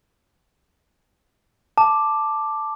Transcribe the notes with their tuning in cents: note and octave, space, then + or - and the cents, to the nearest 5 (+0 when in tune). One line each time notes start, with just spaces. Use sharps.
A5 +0 D6 +5